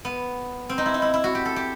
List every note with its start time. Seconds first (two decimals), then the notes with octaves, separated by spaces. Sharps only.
0.05 B3
0.69 C4
0.78 D#4
0.86 E4
0.94 D#4
1.02 E4
1.14 E4
1.24 F#4
1.35 G4
1.45 A4
1.56 G4